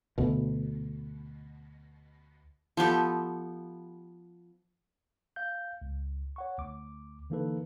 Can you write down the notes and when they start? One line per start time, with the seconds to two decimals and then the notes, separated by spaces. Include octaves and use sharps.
0.18 D2 B2
2.77 F3 B3 G4 A4
5.36 F5 G6
5.82 C#2
6.36 C#5 F#5 C#6
6.58 D2 D6
7.30 D3 E3 A#3 D#4 A4 B4